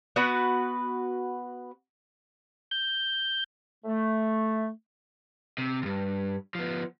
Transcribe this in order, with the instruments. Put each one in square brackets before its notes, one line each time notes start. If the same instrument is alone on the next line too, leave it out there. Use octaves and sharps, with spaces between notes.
[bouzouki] B3 F#4 B4 F#5
[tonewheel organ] G6
[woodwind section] A3
[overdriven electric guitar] C3
D2 G2
F3 B3